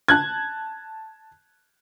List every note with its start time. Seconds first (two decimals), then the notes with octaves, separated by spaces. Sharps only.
0.08 A5 F#6 G#6